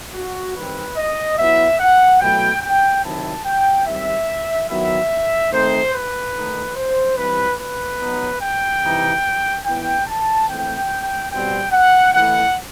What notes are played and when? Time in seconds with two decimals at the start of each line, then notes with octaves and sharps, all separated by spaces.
0.14 F#4
0.55 D#3 G3 C4 B4
0.97 D#5
1.38 F#3 B3 E4 E5
1.79 F#5
2.20 B2 F#3 A3 E4 G5
2.62 G5
3.03 C3 D#3 F#3 C4 E4 A5
3.45 G5
3.86 D#3 G3 C4 E5
4.69 D#3 F#3 B3 E4 E5
5.52 D#3 A3 C4 D#4 C5
5.93 B4
6.35 D#3 A3 D#4
6.76 C5
7.17 E3 G3 C4 E4 B4
7.58 B4
8.00 F#3 B3 D#4
8.42 G5
8.83 C3 E3 G3 D#4
9.65 E3 B3 E4 G5
10.07 A5
10.49 E3 A3 C4 G5
11.31 B2 G3 C4 G5
11.72 F#5
12.14 E3 A3 E4 F#5